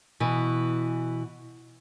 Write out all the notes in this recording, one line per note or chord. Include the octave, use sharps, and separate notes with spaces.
B2 E3